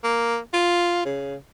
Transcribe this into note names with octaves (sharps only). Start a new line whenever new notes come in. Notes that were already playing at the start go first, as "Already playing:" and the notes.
A#3
F4
C#3